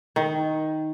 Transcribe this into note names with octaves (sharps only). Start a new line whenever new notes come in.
D#3